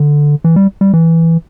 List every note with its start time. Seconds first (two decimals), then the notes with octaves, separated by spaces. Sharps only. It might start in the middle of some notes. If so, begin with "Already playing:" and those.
Already playing: D3
0.44 E3
0.56 G3
0.81 G3
0.93 E3